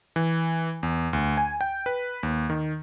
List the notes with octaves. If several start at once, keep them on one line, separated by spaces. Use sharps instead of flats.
E3
E2
D2
G#5
G5
B4
D#2
D#3